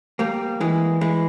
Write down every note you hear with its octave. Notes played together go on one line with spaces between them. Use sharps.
G3 A#3
E3 G#3
E3 G#3